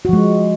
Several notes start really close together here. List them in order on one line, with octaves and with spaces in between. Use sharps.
F#4 F3 G#3